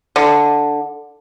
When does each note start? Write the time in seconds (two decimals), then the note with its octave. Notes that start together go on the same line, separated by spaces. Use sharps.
0.16 D3